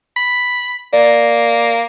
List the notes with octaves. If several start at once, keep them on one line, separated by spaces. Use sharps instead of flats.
B5
A#3 D5